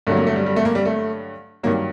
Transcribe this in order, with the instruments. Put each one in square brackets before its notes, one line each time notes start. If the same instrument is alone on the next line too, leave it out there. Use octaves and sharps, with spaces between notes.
[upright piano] G2 D3 F#3 A3
A#3
A3
G3
G3
A3
A#3
G3
A3
G2 D#3 F#3 A#3